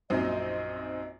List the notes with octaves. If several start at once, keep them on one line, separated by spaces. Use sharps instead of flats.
A#1 F#2 C4 D#4 D#5